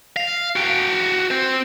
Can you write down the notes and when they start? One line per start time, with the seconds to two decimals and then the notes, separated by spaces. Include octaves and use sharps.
0.16 F5
0.56 F#4 G5
1.31 C4 C5